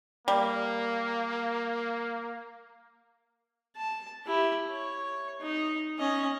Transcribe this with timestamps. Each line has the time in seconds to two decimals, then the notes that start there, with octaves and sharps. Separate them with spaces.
0.28 G3 A#3
3.76 A5
4.25 E4 G4
4.69 C#5
5.41 D#4
5.99 C#4 D#5